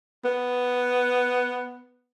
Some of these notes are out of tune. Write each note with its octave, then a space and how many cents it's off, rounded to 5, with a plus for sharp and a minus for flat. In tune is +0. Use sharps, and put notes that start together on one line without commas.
B3 +0